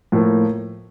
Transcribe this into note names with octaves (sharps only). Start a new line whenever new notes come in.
A2 F3 A#3